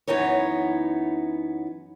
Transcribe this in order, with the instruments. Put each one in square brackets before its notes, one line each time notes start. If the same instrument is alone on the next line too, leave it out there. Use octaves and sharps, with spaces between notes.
[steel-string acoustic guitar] F#2 E3 B3 D#4 C#5